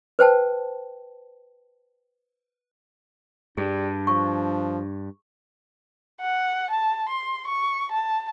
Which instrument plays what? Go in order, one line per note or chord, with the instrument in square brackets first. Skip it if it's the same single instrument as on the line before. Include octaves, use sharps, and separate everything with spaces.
[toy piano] B4 C5 G5 A5
[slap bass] G2 [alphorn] G3 [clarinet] D4 [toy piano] G#4
[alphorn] F3 [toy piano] C#6
[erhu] F#5
A5
C6
C#6
A5